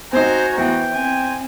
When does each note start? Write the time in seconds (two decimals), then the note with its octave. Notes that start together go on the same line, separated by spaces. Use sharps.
0.13 C4 D#4 F#4 C5 G#5 A#5
0.58 E3 B3 G5
0.94 C4 G#5